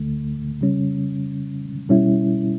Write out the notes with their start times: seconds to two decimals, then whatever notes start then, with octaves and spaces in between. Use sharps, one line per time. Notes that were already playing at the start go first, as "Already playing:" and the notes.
Already playing: D2 D3 A3
0.61 C#3 G3 C#4
1.89 B2 G3 C#4 E4